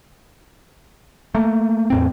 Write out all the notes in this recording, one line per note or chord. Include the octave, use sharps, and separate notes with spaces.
A3 A#3
E2 A2 C4